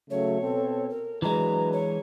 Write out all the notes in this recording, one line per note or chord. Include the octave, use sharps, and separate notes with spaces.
C#3 F#3 A3 C#5
B2 C4 A4
A#4
E3 F#3 G#3 D4 B4 A#5
C#5